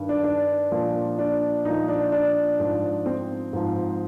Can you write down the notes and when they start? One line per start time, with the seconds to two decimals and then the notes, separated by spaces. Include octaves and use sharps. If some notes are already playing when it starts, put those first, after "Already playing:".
Already playing: G2 D#3
0.09 D4
0.24 D4
0.72 A#2 F3
1.19 D4
1.65 A#2 F3 D#4
1.88 D4
2.12 D4
2.60 G#2 F3
3.06 C4
3.53 G#2 F3